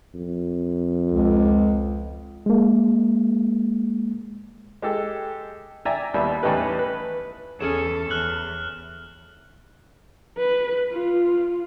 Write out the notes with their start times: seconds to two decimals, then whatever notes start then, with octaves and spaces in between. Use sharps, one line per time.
0.14 F2
1.12 C#2
2.46 G#3 A#3
4.82 G#3 G4 A4
5.85 D5 E5 G5 G#5 A#5
6.14 D#2 G3 B3 E5
6.43 E2 A2 C#4 D#4 G4 B4
6.79 B4
7.60 E2 C#4 G#4 A4 C#5 E7
8.10 E2 F6 F#6 F#7
10.37 B4
10.92 F4